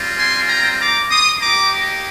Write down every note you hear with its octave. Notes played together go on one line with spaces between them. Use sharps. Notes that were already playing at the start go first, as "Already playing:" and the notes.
Already playing: G3 C4 F4
G#5 C6
G5 A#5
A#5 D6
C6 D#6
A#3 D#4 G4 A#5 D6